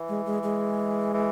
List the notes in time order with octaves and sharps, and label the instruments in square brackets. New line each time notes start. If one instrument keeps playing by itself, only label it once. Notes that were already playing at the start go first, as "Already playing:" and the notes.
Already playing: [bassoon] E3
[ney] G#3
G#3
G#3
[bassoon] E3